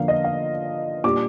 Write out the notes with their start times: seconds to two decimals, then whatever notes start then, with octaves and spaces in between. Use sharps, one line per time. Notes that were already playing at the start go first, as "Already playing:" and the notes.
Already playing: D3 F3 A#3 F5
0.08 D#5
0.24 F5
1.04 A#2 G3 D4 F4 D6